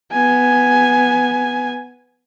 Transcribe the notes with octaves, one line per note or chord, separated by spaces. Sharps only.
B3 G#5